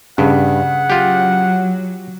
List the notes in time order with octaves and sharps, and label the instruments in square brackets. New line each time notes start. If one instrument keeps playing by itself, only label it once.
[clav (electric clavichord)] G2 [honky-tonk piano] C#3 [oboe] F#5
[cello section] F#3 [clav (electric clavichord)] F4 G4